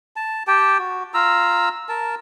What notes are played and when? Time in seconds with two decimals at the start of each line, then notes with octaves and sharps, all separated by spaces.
0.16 A5
0.47 G4 G5 A5
0.79 F#4
1.14 F4 A#5 E6
1.89 A#4 A5